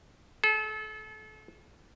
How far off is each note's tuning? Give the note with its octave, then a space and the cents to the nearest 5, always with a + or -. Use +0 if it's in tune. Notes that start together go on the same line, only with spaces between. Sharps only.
A4 -35